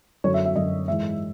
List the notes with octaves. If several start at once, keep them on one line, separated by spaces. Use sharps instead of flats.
F#2 D3 F#3 C#5
E5
E5
F#2 D3 F#3 D#5
G#2 E3 G#3 E5